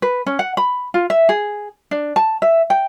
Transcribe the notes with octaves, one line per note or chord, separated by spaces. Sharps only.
B4
C#4
F#5
B5
F4
E5
G#4
D4
A5
E5
G5